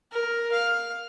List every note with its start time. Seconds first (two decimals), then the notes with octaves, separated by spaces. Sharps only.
0.12 A#4
0.52 F5